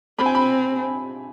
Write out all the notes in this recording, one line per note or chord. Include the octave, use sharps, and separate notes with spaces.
C4 B5
G#5
B5